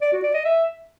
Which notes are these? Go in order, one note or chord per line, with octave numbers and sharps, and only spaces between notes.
D5
F#4
D5
D#5
E5